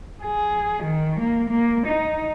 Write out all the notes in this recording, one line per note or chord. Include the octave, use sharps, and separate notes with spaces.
G#4
D#3
A#3
A#3
D#4